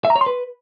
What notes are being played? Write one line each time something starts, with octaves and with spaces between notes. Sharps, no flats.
E5
A#5
C#5
C6
B4